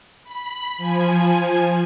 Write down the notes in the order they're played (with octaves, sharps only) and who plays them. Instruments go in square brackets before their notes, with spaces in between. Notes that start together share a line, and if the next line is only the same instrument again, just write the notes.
[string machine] B5
F3 G#5